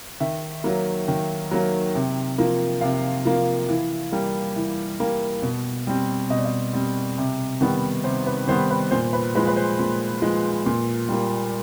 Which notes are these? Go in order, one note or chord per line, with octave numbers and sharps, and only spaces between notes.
D#3 E5
F#3 A#3
D#3
F#3 A#3
C3
F3 A#3
C3 F5
F3 A#3
E3
G3 A#3
E3
G3 A#3
B2
G3 C4
B2 D#5
D5
D#5
G3 C4
C3
D#3 G3 B3
C3 C5
B4
D#3 G3 B3 C5
B4
A#2 C5
B4
F3 G#3 B4
B4
C5
A#2
F3 G#3
A#2
G3 A#3